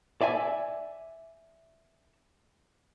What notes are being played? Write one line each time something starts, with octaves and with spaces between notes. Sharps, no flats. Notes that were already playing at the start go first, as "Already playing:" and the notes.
D5 E5 G#5